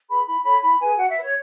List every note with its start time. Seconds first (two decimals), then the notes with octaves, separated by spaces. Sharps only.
0.09 G#4 B4 B5
0.26 E4 B5
0.44 A4 C#5 B5
0.62 E4 B5
0.80 G#4 B4 G#5
0.97 F#4 F#5
1.09 E5
1.15 B4
1.22 C#5